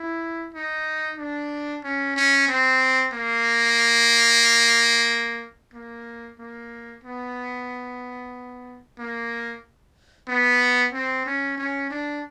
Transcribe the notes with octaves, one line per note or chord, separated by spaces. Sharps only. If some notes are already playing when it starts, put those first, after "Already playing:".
Already playing: E4
D#4
D4
C#4
C#4
C4
A#3
A#3
A#3
B3
A#3
B3
C4
C#4
C#4
D4